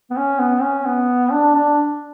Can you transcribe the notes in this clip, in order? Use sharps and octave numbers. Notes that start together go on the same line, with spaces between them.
B3
C#4
B3
C#4
B3
D4
D4